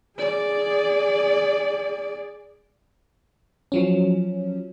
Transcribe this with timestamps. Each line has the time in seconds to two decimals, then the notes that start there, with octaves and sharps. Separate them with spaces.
0.19 G#4 D5
3.72 F3 F#3 C#4